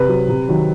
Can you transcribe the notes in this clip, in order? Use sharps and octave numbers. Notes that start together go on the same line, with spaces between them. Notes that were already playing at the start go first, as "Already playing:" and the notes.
Already playing: C3 B4
F#3
C3
D#3 F#3